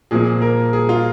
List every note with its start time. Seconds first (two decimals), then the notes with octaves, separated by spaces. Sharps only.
0.11 A#2 F3 A#3 G#4
0.42 A#4
0.73 G#4
0.89 F4